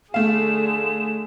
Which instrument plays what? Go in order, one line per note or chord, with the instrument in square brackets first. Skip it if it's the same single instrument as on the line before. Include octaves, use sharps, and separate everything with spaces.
[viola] D3 G#4 [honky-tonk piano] A3 F5 [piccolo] E7